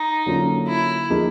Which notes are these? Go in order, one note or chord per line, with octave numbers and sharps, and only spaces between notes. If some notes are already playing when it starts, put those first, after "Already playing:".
Already playing: D#4
D3 F#3 A#3 C#4 F4
E4
F3 A#3 D#4 G#4